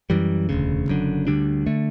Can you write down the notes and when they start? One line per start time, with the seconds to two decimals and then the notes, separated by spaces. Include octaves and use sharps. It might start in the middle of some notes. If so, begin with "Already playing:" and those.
0.10 F#2 E3 G3
0.49 E1 D2 C#3
0.88 F#1 F#2 D3
1.27 D2 D3 G3 D4
1.66 D3 A3